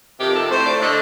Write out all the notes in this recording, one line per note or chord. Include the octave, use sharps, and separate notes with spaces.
F2 C3 D#3 G4
A4
A2 A3 C5
D5
D3 A3 D#5